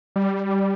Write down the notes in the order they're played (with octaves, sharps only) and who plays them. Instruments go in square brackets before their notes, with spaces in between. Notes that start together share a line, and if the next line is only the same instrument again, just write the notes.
[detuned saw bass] G3